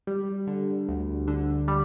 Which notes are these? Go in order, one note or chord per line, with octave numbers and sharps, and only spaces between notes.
G3
D3
D2
D3
G3